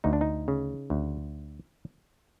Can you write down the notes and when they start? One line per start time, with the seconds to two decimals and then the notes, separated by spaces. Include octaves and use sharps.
0.04 D2 D#4
0.13 D4
0.21 D#4
0.48 C#3
0.90 D2